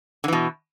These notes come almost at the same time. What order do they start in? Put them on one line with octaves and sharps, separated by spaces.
D3 E3 B2